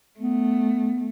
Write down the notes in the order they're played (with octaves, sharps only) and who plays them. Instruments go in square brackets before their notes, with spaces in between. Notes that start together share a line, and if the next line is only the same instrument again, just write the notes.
[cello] A3 [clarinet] B3